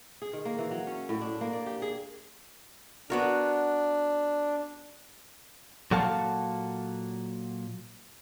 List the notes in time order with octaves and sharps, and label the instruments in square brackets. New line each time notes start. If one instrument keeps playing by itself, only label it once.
[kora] G#4
D#3
A#3
E3
F#3
C#4
A2
D4
A#3
D5
G4
G#4
[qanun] B3 F#4 A#4 [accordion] D4
[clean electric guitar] A#2 F#3 F#4 A4 F5 A5